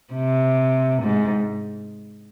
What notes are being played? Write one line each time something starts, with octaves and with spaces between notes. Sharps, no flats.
C3
G#2